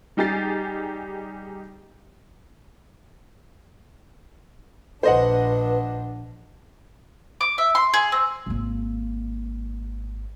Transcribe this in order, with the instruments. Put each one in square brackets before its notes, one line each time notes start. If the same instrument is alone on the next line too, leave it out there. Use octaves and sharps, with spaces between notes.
[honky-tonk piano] G3 D#4 G4 G#4 A6 C7
[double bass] A#1 D4 [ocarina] B4 [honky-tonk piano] C5 D#5 F#5
[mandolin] D6
E5
C6
G#4
C4
[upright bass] G#1 A#3